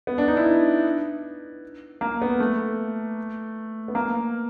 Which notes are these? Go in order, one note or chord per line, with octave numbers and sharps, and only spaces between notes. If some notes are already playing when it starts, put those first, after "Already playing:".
B3
D4
D#4
E4
A#3
B3
A3
B3
A#3